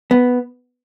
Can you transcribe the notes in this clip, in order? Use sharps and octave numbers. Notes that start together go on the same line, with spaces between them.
B3